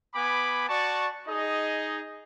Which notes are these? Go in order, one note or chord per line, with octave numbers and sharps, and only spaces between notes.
B3 G#5 B5 D6
F#4 D5 A5 C#6
D#4 G#4 D#5